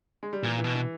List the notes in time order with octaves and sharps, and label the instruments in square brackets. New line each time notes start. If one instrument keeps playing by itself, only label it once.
[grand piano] G#3
G3
[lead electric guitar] A#2 [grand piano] E3
[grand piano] E3
[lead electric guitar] B2
[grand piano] E3